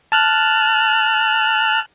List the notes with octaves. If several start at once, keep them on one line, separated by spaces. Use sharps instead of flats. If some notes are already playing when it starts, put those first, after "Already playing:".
A5 F6 F#6